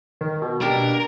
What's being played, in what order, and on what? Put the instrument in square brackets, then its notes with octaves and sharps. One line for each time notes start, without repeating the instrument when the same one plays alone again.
[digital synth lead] D#3
B2
[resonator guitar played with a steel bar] A#3 D4 G4 [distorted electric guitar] A#4